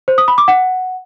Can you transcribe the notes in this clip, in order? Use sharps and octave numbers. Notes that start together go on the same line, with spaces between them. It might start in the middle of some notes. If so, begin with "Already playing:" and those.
C5
D#6
B5
D6
F#5